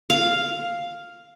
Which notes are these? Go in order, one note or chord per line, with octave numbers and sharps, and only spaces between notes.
F5